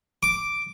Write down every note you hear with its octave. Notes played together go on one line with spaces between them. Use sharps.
D6